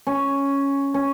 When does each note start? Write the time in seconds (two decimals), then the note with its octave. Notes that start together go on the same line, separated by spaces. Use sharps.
0.07 C#4
0.94 C#4